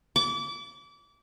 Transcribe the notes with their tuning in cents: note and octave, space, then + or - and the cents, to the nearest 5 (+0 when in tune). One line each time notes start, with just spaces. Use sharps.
D6 -30